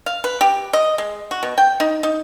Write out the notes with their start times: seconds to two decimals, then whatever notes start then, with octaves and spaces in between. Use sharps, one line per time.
0.06 F5
0.24 B4
0.41 G4
0.73 D#5
0.98 G#3
1.31 F#4
1.43 B2
1.58 G5
1.80 D#4
2.03 D#4